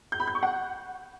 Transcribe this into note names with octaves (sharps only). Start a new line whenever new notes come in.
G6
B5
G6
C#6
F#5